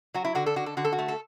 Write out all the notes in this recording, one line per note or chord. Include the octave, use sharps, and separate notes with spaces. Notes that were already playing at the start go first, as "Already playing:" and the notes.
F#3 F#4
E4
D3 F#4
A4
D3 F#4
A4
D3 F#4
A4
F#4
A3
A4